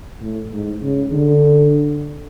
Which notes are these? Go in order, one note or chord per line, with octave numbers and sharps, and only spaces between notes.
A2
G#2
C#3
D3